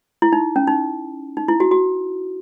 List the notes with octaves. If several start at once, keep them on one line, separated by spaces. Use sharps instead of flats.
E4
D#4
C#4
D#4
D#4
E4
F#4
F#4